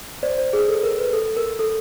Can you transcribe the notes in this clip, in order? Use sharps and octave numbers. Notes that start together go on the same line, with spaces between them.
C5 D5
C5
G#4
A4
A#4
B4
A4
A#4
A4